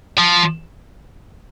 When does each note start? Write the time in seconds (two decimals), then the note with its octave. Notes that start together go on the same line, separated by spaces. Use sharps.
0.18 F3